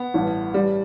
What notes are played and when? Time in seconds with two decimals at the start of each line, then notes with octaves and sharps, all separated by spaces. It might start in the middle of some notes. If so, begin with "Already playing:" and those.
Already playing: B3
0.14 A1 G2 E3
0.54 A1 G2 E3 G3